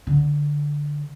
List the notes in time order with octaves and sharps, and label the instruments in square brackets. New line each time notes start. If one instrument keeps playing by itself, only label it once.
[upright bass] D3